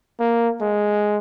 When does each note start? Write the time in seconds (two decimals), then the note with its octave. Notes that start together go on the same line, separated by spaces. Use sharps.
0.20 A#3
0.61 G#3